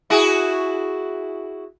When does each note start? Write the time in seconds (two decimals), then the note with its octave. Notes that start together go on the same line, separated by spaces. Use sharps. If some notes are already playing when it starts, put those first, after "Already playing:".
0.10 E4 F#4 G#4